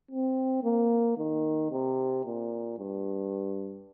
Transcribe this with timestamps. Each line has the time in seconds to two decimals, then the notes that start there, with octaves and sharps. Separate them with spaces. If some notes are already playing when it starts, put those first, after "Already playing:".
0.11 C4
0.64 A#3
1.18 D#3
1.71 C3
2.26 A#2
2.79 G2